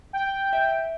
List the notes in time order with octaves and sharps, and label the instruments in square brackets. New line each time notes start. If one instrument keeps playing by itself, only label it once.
[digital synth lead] G5
[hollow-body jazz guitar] E5